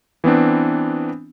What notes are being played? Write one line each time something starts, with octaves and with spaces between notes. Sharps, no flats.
E3 B3 C4 D4